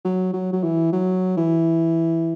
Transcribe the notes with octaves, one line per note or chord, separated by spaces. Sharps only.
F#3
F#3
F#3
E3
F#3
E3